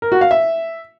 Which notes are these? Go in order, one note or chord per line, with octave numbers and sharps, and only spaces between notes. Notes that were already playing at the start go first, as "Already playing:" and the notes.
A#4
F#4
F5
E5